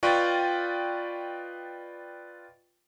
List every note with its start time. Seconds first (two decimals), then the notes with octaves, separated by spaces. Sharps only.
0.03 F4 B4 D5 D#5 G5 C#6